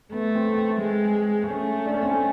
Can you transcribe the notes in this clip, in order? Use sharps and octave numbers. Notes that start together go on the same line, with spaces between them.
A3 B3
C4
C4
G#3
A3 C#4
D4
C#4
C4
C#4